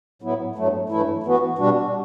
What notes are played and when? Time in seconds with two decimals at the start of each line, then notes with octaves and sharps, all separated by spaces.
0.22 A2 F#3 B3 E4
0.56 G2 F#3 A3
0.90 G2 E3 A3 E4
1.23 E3 B3 F#4
1.58 B2 G3 D4 F#4